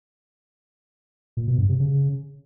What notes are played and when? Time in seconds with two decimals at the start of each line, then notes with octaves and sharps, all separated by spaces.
1.37 A#2
1.48 B2
1.58 G2
1.69 C3
1.80 C#3